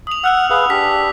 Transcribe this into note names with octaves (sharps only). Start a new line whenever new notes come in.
D#6 F7
F#5 E6 F6 F7
G#4 B4 F5
D4 G4 B6